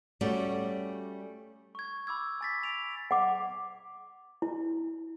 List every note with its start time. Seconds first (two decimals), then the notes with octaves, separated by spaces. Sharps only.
0.21 G3 A3 C#4 F#4 D5
1.75 C#6 G#6
2.07 B5 D6 E6 G#6
2.41 G#5 A6 B6
2.63 D7 F7
3.11 F#5 D6
4.42 E4